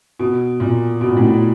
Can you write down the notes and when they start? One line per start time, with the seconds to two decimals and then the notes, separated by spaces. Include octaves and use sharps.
0.19 B2
0.60 A#2
1.01 B2
1.09 A#2
1.16 A2
1.25 A#2